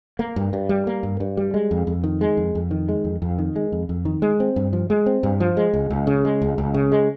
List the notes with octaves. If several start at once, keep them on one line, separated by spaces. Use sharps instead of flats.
A#3
G2
G2
G3
A#3
G2
G2
G3
G#3
F2
F2
D#3
G#3
F2
F2
D#3
G#3
F2
F2
D#3
G#3
F2
F2
D#3
G#3
C4
G2
F3
G#3
C4
G2
F3
G#3
C#2
C#2
C#3
G#3
C#2
C#2
C#3
G#3